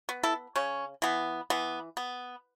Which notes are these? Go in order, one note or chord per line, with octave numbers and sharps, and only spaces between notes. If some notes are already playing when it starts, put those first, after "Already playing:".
B3
E4 A4
C#3 C#4
E3 B3
E3 B3
B3